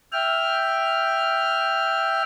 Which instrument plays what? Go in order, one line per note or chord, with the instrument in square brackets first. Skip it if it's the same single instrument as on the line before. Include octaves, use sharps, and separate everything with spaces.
[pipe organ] E5 G5 F6